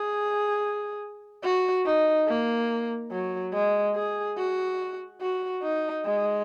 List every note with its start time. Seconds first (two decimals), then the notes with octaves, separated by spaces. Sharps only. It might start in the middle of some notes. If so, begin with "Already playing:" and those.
Already playing: G#4
1.43 F#4
1.85 D#4
2.27 A#3
3.11 F#3
3.53 G#3
3.95 G#4
4.37 F#4
5.21 F#4
5.63 D#4
6.05 G#3